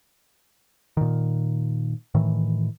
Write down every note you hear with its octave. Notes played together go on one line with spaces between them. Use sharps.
A#2 D#3
A2 D#3 E3